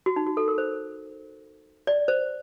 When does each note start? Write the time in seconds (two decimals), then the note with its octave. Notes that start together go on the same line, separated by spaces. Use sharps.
0.06 F#4
0.16 D#4
0.26 F#4
0.37 A4
0.48 A#4
0.58 C5
1.87 D5
2.08 C5